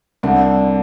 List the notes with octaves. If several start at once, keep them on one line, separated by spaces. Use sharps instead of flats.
C2 D3